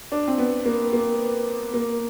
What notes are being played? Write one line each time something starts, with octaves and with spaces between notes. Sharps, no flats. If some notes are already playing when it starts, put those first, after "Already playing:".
D4
C4
B3
A#3
A#3
A#3